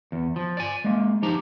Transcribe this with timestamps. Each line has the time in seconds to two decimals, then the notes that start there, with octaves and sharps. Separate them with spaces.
0.12 E2
0.36 F3
0.57 D5 G#5
0.84 G#3 A#3
1.22 F3 D#4 G4 A#5